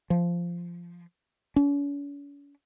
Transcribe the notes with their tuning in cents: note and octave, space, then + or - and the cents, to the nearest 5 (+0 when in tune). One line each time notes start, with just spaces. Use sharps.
F3 -10
C#4 +45